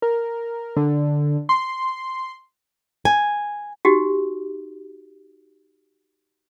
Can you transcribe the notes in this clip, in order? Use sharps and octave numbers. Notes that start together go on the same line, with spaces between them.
A#4
D3
C6
G#5
D#4 F#4 G4